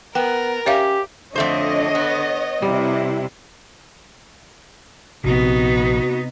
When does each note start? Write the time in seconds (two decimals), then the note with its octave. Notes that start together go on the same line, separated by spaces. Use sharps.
0.15 B3 A#4 G5
0.66 C#4 G4 C#5 E5 F5
1.36 F2 D3 A3 C5 C#5 D#5
1.95 B3
2.62 C3 G3 E4
5.24 A#1 C3 B3 D#4 F#4